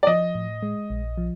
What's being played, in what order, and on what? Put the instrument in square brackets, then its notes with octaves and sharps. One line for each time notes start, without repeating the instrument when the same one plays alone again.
[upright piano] D5
[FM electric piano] F3 [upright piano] D#5
[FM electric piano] A2
G#3
A#1
F3